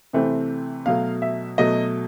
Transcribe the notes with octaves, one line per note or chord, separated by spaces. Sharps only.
C3 E3 A3 C4
B2 F#3 A3 F5
E5
B2 F#3 A3 D#5